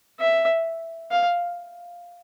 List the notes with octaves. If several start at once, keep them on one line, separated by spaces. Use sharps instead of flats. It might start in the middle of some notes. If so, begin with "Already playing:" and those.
E5
F5